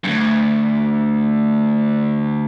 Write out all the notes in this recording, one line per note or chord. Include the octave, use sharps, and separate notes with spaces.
D2 G2